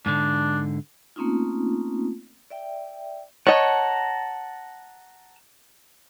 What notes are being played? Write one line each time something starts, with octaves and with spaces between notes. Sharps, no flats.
G#2 D3 D4
A3 A#3 C4 C#4 D#4 F4
D5 E5 G5
C#5 D#5 F#5 A5 A#5